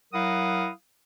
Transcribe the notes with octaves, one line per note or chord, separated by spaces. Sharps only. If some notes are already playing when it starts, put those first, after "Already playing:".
F#3 E4 A#4 F5 F#5 D#6